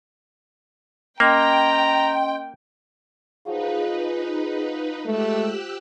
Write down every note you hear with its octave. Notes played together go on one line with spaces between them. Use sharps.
A#3 C#4 D#5 G5 A#5 C6
F3 F#3 D#4 F4 G#4 B4
G#3 A3 G4 E6 F#6